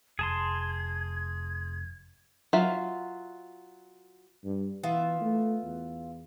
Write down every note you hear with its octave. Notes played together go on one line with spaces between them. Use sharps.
F1 G#4 A5 C6 G#6
F#3 F4 E5
G2
E3 B3 F4 E5
A3
E2